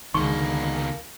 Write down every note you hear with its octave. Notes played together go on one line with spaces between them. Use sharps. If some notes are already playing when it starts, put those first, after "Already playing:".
C#2 B2 D3 D#3 G#3 A#3 C#6